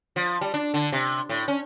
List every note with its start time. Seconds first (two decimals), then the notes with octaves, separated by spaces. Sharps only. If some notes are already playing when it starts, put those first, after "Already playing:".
0.16 F3
0.41 G3
0.54 D4
0.74 D3
0.92 C3
1.29 A2
1.48 C#4